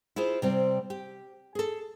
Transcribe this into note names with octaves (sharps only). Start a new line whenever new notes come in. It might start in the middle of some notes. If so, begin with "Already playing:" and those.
E4 F4 G#4 C5
C3 G3 C4
G4
G#4 A4